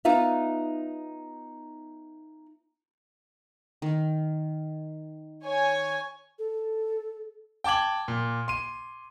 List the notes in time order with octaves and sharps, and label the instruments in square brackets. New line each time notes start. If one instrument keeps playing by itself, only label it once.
[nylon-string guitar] B3 D#4 F4 E5
[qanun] D#3
[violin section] C#5 G#5
[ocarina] A4
[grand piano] G5 A5 D6 G#6 F#7
A#2
C6 D#7